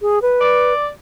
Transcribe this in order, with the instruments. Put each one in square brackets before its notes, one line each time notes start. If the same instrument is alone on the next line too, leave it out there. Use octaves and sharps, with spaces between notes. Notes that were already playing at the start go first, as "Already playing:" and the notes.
[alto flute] G#4
B4
[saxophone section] D5